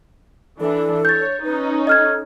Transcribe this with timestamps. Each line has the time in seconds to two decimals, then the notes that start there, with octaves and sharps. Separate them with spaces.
0.60 E3 D4 A4
1.05 C#5 G6 A6
1.44 C#4 D#4 B4
1.87 A4 D#5 F6 G#6